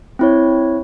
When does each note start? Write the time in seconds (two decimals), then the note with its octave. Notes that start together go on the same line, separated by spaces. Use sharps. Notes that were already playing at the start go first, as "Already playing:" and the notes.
0.19 C4 E4 C#5